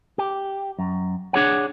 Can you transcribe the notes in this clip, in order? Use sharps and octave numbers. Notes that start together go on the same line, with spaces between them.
G4
F#2
D4 G#4 C#5 F#5